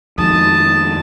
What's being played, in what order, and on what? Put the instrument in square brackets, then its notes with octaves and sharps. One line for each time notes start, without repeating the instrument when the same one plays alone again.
[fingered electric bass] F2 D#3 G#3 [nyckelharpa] A5 [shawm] D#6